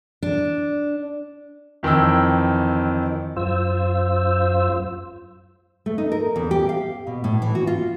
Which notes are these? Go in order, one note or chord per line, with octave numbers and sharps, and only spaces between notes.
D4
F2 D#3 E3 G5 E6
F#2 F4 C5 E6
A3
D#4
A#4
E2
G4
F5
B2
A2
E3
F#4
F4